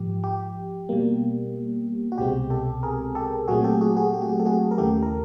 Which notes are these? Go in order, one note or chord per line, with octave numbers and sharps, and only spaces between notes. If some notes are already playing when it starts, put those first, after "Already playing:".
Already playing: G#2 F3 G4
G4
B2 G3 A#3
F#4
C2 B2 G#3 C4 G4
G4 A4
G#4 A#4
G4 A4
A#2 F#3 A3 C4 F#4 G#4
G4 A4
F#4 G#4
F#4 G#4
G4
F#4
G4
A4
F#4 G#4
A#4
D#2 C#3 E3 A3 G4 A4
A#4